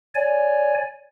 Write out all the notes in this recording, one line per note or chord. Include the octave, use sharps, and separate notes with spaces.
C#5 D5 G#5